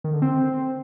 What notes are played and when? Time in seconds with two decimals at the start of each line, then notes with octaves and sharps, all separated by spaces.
0.04 D#3
0.13 D3
0.22 C4